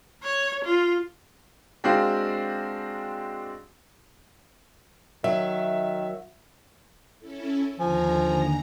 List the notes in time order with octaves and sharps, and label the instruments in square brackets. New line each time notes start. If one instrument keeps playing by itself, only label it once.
[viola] C#5
F4
[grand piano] G#3 C4 D4 F#4 G4 F5
[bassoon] D#3 [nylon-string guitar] F#3 [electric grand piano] E5
[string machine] C#4 E4 A4
[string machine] D#2 D3 A#5 [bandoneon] F3 [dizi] G#5